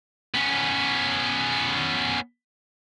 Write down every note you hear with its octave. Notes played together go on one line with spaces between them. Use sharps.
B3 C#4